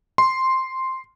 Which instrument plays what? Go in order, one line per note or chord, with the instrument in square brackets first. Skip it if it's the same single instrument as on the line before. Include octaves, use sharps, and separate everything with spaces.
[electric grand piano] C6